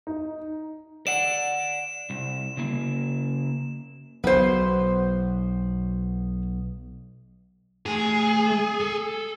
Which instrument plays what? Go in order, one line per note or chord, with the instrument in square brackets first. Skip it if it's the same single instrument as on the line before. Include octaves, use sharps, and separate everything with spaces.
[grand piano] D#4
[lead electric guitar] D5 F#5 [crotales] E7
[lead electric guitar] C2
C#3 A#3
[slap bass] B1 B2 [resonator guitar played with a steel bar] B4 C5
[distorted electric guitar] A3 G#5 [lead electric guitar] G#4
[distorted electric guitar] A4